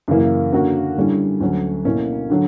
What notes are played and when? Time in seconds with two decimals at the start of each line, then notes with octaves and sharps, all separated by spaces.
0.08 F#2 C#3 E3 A#3 E4
0.52 D3 A#3 C#4 F#4 A#4
0.96 D3 G3 C#4 E4
1.40 D2 D3 F#3 C#4
1.85 B2 A#3 C#4 E4
2.30 D3 F#3